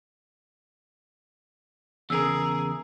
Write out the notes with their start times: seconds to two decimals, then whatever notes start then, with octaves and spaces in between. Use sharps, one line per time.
2.10 E2 C#3 G#4 A#4 E6